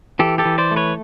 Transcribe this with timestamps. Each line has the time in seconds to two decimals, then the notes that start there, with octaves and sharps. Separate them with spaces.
0.19 E3 G4 A4
0.38 G4 A4
0.45 E3
0.58 C5 D5
0.71 A3
0.76 B4 C#5